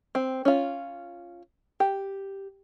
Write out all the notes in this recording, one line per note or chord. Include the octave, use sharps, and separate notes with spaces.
C4
C#4 F4
G4